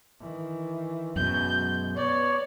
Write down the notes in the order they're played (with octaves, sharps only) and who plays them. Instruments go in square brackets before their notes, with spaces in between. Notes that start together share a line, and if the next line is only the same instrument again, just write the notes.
[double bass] D#3 E3
[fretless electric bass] F#2 B2 [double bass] F#3 G#3 [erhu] G6
[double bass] B3 [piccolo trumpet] C#5 [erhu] D5